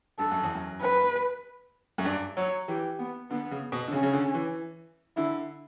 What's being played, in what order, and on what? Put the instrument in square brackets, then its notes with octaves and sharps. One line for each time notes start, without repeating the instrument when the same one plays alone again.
[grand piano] G2 [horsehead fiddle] A4
[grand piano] F#2
E2
F#2
[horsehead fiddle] B4
[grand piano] F#2
[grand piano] G2 [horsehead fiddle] D5
[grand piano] F#3 [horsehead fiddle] C#5
[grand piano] E3 [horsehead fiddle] G4
[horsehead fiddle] B3
[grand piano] D3 [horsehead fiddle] B3
[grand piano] C#3
B2
D3
[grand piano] C#3 [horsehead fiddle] C#4
[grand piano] C#3
D3
E3
[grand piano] D3 [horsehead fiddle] E4